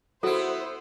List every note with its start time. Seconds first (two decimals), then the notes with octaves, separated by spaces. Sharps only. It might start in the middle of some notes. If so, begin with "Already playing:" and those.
0.23 B3 E4 F#4 A4 C5